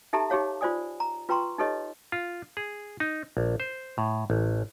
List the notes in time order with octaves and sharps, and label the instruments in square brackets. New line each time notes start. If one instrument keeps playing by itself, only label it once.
[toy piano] D#4 G4 A4 E5 A5 A#5
D#4 G4 G#4 C#5 F5
F4 C5 D5 G#5 D#6
A#5
F4 B4 G5 A#5 C6 C#6
D#4 G4 A4 B4 C#5 D#5
[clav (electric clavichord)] F4
G#4
D#4
A#1
C5
A2
A1